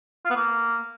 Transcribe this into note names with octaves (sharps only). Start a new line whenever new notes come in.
F4
B3
A#3